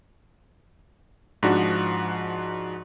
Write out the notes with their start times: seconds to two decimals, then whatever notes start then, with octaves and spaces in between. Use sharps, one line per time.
1.43 G#2 F3 D4 F#4